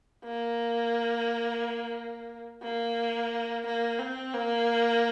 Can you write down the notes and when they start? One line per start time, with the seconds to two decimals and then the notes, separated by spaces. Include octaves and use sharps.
0.25 A#3
2.62 A#3
3.66 A#3
3.99 C4
4.34 A#3